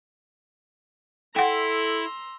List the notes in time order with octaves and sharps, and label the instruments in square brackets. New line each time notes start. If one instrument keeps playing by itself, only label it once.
[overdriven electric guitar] E4 [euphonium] A4 [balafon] F#5 G5 [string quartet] A#5 C6 E6